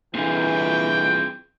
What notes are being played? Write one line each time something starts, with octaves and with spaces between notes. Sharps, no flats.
A#2 D3 E3 C4 F4 G#4 G5